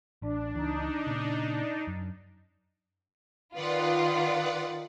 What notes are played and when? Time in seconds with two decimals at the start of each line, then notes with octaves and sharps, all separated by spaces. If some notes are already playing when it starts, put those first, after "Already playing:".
0.22 A1 D4
0.54 C#2 E3 D4 D#4
1.07 A#2 C#3
1.87 F#2
3.54 D#3 F4 B4 D5 F#5